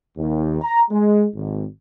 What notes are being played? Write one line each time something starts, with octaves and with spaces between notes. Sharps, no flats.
D#2
A#5
G#3
G#1